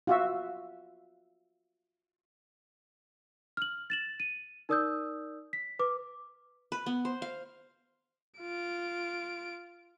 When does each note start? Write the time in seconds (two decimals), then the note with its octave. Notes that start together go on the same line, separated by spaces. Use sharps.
0.07 F4 F#4 E5
3.57 F6 F#7
3.90 A6 E7 F#7
4.20 D#7
4.69 D#4 A#4 D5 D#6 E6 G6
5.53 B6
5.79 B4 D6
6.72 B4
6.86 B3
7.05 C5
7.22 F5
8.40 F4 D7